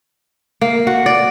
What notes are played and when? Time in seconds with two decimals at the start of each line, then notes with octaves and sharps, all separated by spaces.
0.61 A#3
0.87 F#4
1.06 D5